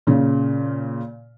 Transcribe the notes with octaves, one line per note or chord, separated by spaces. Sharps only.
A#2 C#3